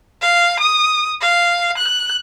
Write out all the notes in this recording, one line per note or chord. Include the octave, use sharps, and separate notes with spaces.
F5
D#6
F5
F#6